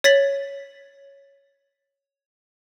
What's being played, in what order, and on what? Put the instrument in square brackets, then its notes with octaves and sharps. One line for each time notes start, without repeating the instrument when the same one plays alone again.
[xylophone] C#5 A6 B6 F#7